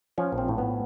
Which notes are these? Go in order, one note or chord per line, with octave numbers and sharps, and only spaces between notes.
F3 C#4
A#1
C4
A2
B3